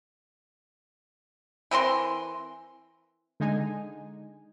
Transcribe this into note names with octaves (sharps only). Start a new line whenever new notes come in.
E3 C4 A#4 C6
D3 G#3 D#4 G#5